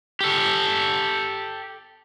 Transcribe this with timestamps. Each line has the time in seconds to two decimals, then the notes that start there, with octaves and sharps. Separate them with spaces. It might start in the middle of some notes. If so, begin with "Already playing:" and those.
0.21 G4 A4